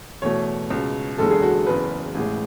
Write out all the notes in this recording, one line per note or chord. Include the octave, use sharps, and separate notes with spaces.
E2 B2 A3 C#5
C#2 B2 G#3
F#1 E2 D3 G#3 A4
G#4
F#4
F#1 E2 C#3 B4
A1 A2 G#3